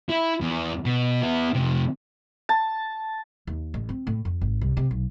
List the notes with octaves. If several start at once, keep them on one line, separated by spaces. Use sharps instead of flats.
E4
E2
B2
B3 E4
F2 C3
A5
D#2
A1
C4
A2
F2
G#1
C2
C3
B1